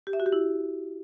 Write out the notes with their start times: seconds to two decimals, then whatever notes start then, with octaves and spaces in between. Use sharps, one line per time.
0.07 G4
0.13 E5
0.20 F#4
0.26 G4
0.32 E4